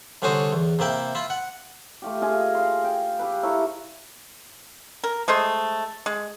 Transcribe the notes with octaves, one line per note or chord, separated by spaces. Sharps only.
C2 D3 C#4 F#4 C5 D#6
E2
C3 A#3 E4 G5
E4 F4
F#5
A3 F4 G4
F4 G#4 D#5
F5 C6
G5
G4 A4 B4
E4 A4 C#5 A#5
A#4
G#3 A3 C5 D#5
G#3